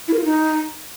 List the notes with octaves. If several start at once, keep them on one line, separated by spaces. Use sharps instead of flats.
E4
A#4
F4
D#4